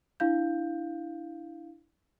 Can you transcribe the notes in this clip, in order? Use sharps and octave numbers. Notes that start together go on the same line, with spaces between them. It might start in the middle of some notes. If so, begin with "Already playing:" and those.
D4 E4 F5 G6